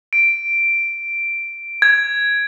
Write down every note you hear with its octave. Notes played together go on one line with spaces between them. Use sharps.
D7
G#6